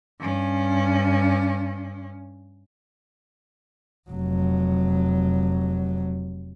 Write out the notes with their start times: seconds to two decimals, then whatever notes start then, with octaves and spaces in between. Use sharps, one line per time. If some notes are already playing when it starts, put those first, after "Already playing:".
0.20 G2 C#4
4.10 F1 F#3